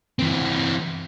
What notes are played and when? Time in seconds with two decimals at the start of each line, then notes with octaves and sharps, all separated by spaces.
0.19 E3 C4